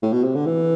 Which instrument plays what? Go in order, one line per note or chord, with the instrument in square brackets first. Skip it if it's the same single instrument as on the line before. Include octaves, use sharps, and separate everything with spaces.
[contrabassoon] A2
B2
C3
D3
E3